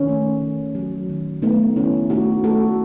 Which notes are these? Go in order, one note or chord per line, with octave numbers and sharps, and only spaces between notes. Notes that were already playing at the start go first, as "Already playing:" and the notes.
Already playing: D#3 C#4
A3
D#3
F#3
D#3
A3 B3 D#4
D#3 C#4 E4
A3 D#4 F#4
A3 F#4 A4